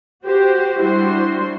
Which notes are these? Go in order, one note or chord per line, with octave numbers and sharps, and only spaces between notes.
F#4 G4 C5
G3 D4 E4 F#4 C5 C6